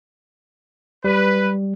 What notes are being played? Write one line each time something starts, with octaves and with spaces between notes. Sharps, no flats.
G3 B4